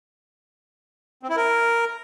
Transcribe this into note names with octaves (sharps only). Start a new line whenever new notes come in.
C4
E4
A#4